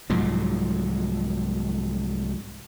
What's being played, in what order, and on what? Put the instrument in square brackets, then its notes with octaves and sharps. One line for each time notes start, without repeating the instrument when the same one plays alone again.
[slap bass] C2 G#2 F3 F#3